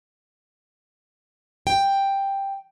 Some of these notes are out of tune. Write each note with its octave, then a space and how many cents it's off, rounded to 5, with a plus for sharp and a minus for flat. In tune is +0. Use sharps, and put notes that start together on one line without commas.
G5 +5